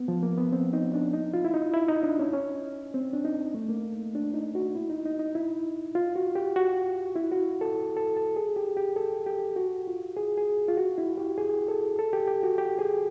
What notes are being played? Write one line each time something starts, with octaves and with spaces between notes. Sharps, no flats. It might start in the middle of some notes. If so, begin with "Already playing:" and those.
Already playing: B3
F3
A#3
B3
C4
D#4
D4
D#4
F4
E4
D#4
E4
D#4
D4
C#4
C#4
C4
D4
D#4
A3
A#3
D4
D#4
F#4
E4
D#4
D#4
D#4
E4
F4
F#4
G4
F#4
E4
F#4
A4
A4
A4
G#4
G4
G4
A4
G4
F#4
F4
G#4
G#4
F4
F#4
E4
G4
G#4
A4
A4
G4
G4
F#4
G4
G#4